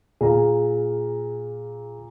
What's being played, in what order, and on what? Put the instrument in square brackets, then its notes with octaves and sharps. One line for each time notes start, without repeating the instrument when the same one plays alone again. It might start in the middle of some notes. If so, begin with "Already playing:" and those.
[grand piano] A#2 F5 A#5 [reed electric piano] G#4